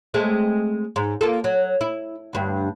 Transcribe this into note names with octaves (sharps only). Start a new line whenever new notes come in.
G#3 A3 C4
G#2
A#3 F4 A4
F#3
E4
D2 G2